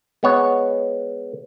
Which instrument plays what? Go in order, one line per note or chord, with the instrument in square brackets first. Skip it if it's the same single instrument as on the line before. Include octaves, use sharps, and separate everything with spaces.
[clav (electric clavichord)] G#3 B3 C#5